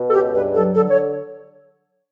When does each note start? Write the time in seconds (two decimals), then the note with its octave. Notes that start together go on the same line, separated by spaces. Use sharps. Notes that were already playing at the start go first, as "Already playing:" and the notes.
Already playing: B2
0.09 A4
0.13 C#2 G4
0.34 G2 B4
0.55 F#3 A4
0.76 D3 A4
0.90 C#5